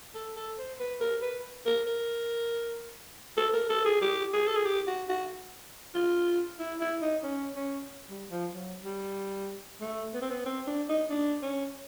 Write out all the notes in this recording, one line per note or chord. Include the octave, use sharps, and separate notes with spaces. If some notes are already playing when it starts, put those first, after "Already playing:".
A4
A4
C5
B4
A#4
B4
A#4
A#4
A4
A#4
A4
G#4
G4
G#4
A4
G#4
G4
F#4
F#4
F4
E4
E4
D#4
C#4
C#4
G3
F3
F#3
G3
A3
B3
C4
B3
C4
D4
D#4
D4
C#4